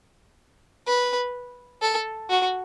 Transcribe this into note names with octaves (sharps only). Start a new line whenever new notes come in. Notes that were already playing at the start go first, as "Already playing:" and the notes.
B4
A4
F#4